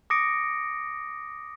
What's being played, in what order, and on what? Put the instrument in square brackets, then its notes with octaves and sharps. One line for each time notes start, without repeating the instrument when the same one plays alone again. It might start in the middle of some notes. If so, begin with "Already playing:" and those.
[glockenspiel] D6 D#6 A#6 C#7 D7